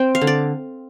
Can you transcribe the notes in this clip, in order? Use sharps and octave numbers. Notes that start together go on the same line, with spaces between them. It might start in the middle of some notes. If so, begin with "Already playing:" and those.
Already playing: C4 G5
F5
D3
D5